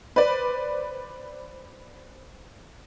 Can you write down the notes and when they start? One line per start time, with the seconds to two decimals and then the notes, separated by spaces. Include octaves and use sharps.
0.16 B4 C5 D5